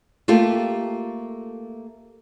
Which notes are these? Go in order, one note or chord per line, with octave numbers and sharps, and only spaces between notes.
A3 A#3 F4 G4 A4